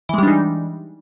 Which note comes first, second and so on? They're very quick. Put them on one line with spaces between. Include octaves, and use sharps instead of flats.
E3 G#3 G3 D4 D#4